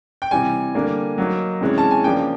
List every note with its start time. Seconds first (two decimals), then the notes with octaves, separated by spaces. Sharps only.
0.22 G5
0.31 C3 E3 G3 G#5
0.74 D3 G3 A#3 D4
1.18 F#3 A#3 D#4
1.61 C3 E3 G#3 C#4
1.78 A5
1.91 G#5
2.04 C#3 F3 A#3 D4 G5